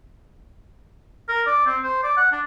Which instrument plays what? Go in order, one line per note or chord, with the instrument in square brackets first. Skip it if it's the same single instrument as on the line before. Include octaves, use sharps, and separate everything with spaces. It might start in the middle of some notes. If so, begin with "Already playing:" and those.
[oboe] A#4
D5
C4
C5
D5
F#5
D4